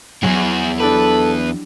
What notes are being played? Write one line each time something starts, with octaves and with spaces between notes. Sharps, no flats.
E2 G2 F#3 E4 G#4
D4 E4 G4 A4 B4